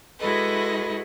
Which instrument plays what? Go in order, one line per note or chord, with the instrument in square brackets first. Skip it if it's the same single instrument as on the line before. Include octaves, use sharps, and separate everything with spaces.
[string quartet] G#3 E4 F#4 A4 B4 D#5